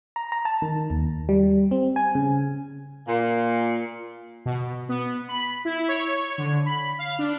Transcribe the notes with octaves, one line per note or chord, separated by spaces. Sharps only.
A#5
A#5
A5
D#3
D#2
G3
C4
G#5
C#3
A#2
B2
B3
B5
E4
C#5
D3
B5
F5
D4